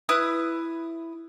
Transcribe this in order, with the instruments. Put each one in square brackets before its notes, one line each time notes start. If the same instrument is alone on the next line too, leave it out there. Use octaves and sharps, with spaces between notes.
[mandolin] E4 B4 D#6 F#6